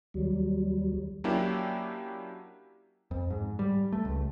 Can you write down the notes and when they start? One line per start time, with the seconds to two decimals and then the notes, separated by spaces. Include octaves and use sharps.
0.14 D#2 F#3 G3
1.24 F#3 A#3 C#4 D4 E4 G4
3.11 F2
3.30 G#2
3.59 G3
3.92 A3
4.05 C#2